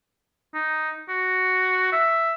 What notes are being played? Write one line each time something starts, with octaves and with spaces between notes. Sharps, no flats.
D#4
F#4
E5